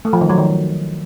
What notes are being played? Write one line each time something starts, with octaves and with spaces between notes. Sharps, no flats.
A3
F3
D#3
F#3
D#3